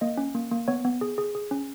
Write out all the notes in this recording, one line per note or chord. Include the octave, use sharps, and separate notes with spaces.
A#3 D#5
C#4
A#3
A#3
B3 C#5
B3
G#4
G#4
G#4
C#4